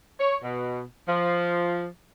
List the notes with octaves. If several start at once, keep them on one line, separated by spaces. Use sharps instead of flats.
C#5
B2
F3